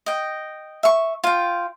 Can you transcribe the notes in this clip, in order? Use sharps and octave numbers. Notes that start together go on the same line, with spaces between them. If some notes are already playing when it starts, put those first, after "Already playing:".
D#5 G5
E5 C#6
F4 G5